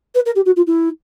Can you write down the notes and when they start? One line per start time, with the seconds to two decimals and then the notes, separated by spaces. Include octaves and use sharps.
0.14 B4
0.25 A#4
0.35 G4
0.45 F#4
0.56 F4
0.66 E4